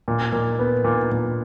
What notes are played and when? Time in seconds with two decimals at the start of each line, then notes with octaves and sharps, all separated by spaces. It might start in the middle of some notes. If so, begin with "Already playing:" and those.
0.08 A#2
0.32 A#2
0.59 B3
0.84 A#2
1.11 A#2